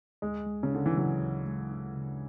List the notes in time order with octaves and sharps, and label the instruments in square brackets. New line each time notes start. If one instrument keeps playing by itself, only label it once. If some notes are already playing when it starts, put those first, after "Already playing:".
[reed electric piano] D2 [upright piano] G#3
[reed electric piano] G#3
[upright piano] C#3
[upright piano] D3 [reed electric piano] D4
[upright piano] E3
[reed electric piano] C#3 [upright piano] F#3
[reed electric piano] D2
G#3
D4
C#3